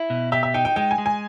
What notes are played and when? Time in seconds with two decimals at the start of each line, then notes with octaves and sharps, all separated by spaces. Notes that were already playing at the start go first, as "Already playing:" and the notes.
Already playing: E4
0.10 B2
0.32 G4 E5
0.43 E5
0.54 D#4 G5
0.65 G5
0.76 G#3 G5
0.91 G#5
0.98 G#3
1.06 G#5